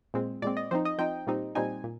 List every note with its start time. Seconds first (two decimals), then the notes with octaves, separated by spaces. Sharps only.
0.14 A#2 G#3 C4
0.42 A#2 G#3 C4 D5
0.57 D#5
0.71 F3 C4 D#4 C5
0.85 D#5
0.98 F3 C4 D#4 G5
1.27 A#2 G3 C4 D#4
1.55 A#2 G3 C4 D#4 G#5
1.84 A#2